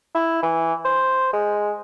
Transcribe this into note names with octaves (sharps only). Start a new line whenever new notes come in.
E4
E3
C5
G#3